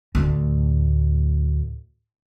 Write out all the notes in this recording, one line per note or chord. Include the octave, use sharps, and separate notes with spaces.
D2 A2